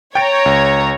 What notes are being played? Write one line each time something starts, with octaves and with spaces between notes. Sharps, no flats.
C#5 G5 A#5 A6 D7
C#2